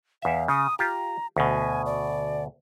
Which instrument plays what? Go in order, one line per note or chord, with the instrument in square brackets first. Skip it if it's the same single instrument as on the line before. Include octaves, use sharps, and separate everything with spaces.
[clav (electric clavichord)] E2 E5 [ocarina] F5
[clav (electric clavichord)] C#3 [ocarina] D#6
[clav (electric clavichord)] F4 G4 [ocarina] A#5
[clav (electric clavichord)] D2 B2 [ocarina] G#5
[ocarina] D5